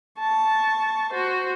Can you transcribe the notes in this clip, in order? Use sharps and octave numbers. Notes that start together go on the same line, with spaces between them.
A5 C#6
F#4 C5